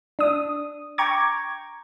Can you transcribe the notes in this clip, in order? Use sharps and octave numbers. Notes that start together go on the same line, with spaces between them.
D4 D#6
G5 A#5 C#6 D6 G#6